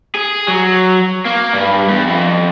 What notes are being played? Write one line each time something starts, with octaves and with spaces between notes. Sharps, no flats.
G#4
F#3
A#3
G2
E2
F2